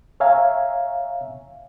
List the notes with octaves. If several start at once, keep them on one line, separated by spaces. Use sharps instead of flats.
C#5 E5 F5 G#5 A#5